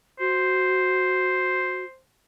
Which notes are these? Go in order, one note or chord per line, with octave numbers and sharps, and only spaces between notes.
F#4 C5